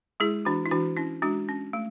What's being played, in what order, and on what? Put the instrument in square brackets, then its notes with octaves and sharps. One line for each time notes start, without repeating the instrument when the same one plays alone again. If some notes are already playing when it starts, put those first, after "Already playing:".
[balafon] G#3 E4 G#4
E3 D4 F#4
E4
E3 D4 F#4
C#4 E4
G#3 D4 F#4
C#4
A3